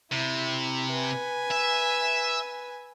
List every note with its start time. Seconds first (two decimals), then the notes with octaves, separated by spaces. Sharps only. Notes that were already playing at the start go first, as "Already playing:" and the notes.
0.12 C3 E4
0.92 B4 G#5
1.51 E5